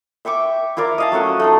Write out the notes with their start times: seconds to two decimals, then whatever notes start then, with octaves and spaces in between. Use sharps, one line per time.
0.25 E5 G5 C#6 D6
0.77 E4 F4 A#4 D5
0.98 D#5 F5 A5
1.12 F#3 A3 C#4 F#5
1.40 A3 D#4 F4